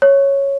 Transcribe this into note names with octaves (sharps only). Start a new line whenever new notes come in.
C#5